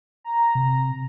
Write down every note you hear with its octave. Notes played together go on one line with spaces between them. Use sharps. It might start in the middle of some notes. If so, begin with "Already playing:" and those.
A#5
C3